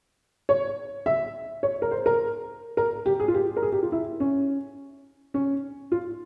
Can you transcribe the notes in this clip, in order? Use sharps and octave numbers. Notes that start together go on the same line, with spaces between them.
C#5
E5
C#5
A#4
C5
A#4
A#4
G4
G#4
F4
G4
A#4
G#4
G4
F4
E4
C#4
C#4
F4